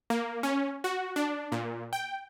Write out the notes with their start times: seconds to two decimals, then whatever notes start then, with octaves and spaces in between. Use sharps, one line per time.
0.10 A#3
0.43 C#4
0.84 F#4
1.16 D4
1.52 A#2
1.93 G5